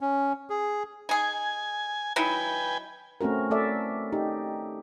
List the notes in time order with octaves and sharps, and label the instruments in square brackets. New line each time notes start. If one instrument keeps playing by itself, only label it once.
[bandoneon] C#4
G#4
[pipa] D#4 G#4 [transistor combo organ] G#5
[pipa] F#3 D#4 E4 [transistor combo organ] B4 G5 G#5
[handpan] A3 C4 C#4 F#4 A#4
A3 A4 D5 E5
D#4 G4